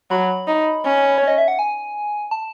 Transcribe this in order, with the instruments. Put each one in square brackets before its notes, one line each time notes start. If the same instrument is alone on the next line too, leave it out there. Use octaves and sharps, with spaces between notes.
[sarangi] F#3 [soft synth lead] B5
[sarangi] D#4
C#4
[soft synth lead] C#5
D#5
E5
F#5
G#5
A5